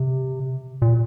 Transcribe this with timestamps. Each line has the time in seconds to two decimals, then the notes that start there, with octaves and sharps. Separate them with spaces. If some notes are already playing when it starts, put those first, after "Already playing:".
Already playing: C3
0.82 A#2